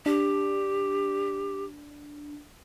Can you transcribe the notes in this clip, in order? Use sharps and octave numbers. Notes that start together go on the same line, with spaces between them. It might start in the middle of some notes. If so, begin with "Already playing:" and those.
D4 G4